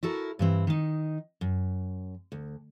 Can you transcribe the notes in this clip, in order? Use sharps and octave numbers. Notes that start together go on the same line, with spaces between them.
E4 F#4 A4 A#4
G2 E3 C4
D#3 D#4
F#2
D2